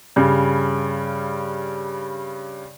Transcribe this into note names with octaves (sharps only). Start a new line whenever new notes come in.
G2 C#3